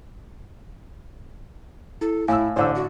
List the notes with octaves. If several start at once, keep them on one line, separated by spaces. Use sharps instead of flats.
E4 A4
A2 E4 F5 G#5 E6
A1 D3 C5 E6
F#4